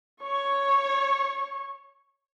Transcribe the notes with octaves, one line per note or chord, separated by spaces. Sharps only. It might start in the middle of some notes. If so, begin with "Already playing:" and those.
C#5 C#6